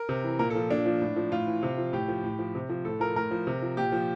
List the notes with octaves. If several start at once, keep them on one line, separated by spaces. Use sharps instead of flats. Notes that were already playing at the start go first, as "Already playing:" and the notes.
Already playing: A#4
C3
E3
A#2 A#4
A4
F3
A#2 D4
F3
A2
F3
A2 F4
E3
C3
F3
A2 G4
F3
A2
F3
C3
F3
A2 A4
F3 A#4
A2 A#4
F3
C3
F3
A#2 G4
F3